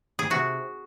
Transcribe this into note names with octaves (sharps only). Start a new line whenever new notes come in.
G#4
C3 F#4